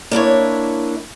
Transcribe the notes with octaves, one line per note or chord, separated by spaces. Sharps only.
A#3 D4 E4 C#5